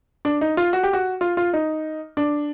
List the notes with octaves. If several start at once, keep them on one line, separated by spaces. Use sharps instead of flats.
D4
D#4
F4
F#4
G4
F#4
F4
F4
D#4
D4